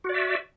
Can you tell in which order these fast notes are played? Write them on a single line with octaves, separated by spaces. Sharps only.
F#4 D5 E5